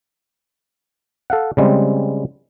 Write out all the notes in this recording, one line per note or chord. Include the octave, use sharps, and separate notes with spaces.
A4 F5 F#5
C#3 G3 G#3 C4